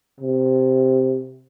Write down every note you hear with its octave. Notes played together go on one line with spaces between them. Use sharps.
C3